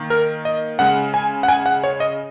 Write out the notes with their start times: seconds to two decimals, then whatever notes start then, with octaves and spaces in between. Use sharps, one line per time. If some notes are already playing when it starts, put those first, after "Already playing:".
Already playing: D#3 A#3
0.10 A#4
0.45 D#5
0.79 C#3 G#3 F#5
1.14 G#5
1.43 F#5
1.48 G#5
1.66 F#5
1.84 C#5
2.00 D#5